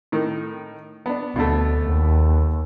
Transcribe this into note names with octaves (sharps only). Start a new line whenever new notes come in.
A2 D#3
B3 D4
D2 B2 D3 A3
D#2